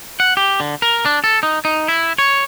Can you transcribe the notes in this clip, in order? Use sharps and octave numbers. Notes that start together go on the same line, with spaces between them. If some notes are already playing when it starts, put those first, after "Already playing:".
F#5
G4
D3
A#4
D4
A4
D#4
D#4
E4
C#5